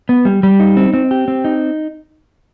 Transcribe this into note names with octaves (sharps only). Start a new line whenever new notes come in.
B3
G3
G3
D#4
C4
C4
G4
C4
D#4